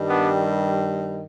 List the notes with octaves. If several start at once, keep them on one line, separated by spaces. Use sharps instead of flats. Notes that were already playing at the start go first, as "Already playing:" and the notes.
Already playing: G2 D#3 G3
B3 D4